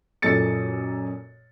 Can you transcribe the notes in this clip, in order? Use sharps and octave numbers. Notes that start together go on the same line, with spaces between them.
F#2 A#2 A4 D#5 A6 C#7